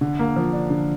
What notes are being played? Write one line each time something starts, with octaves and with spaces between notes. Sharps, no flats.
D3
A#3
F3
D4
D3